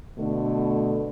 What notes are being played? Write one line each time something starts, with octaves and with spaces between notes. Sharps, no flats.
B2 D3 A3